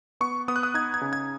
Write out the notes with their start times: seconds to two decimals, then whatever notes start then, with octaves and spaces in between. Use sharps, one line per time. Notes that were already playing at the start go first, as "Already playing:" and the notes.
0.21 B3 C#6
0.48 B3 D#6
0.56 F#6
0.63 D#6
0.74 D#4 G#6
0.94 G#6
1.01 C#3
1.13 G#6